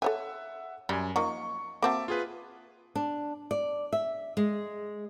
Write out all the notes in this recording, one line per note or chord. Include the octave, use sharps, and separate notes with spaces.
A4 C#5 E5 F#5 G#5
F#2 G3 G#5
F3 A#3 D#4 C#6
A#3 C4 F#4 E5 A5 D6
F4 G#4 B4
D4
D5
E5
G#3